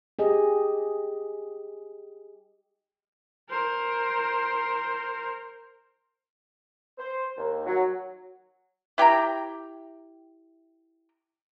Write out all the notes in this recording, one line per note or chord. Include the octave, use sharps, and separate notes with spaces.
G4 G#4 D#5
A#4 C5
C5
D#2
F#3
E4 G4 G5 A#5